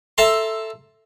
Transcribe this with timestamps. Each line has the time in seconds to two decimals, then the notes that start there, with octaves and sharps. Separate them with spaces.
0.18 A4 E5 A5 A#5 C6